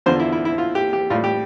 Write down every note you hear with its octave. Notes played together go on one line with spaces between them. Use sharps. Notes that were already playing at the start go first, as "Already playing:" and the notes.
E2 D3 F3 C5
E4
E4
E4
F4
G4
G4
A2 G3 F4
G4